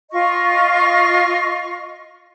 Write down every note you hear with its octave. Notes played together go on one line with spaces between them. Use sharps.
F4 D#5 C#6